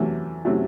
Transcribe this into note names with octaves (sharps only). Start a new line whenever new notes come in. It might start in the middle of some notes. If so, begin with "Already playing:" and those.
Already playing: E2 C3 F#3 A3
C3 F#3 A3